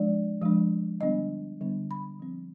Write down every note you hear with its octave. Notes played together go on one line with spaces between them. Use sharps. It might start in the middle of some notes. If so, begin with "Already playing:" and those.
Already playing: F3 G#3 D4 D5
F3 G#3 D4
D3 G3 B3 D4 D#5
D3 G3 B3 D4
B5
F3 C4